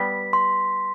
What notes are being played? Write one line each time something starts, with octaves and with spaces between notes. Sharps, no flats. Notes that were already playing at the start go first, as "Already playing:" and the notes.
Already playing: G3 B3 B6
C6